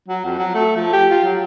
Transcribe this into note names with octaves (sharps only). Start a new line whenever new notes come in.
F#3
F2
F#3
A3
F3
G4
F4
F#3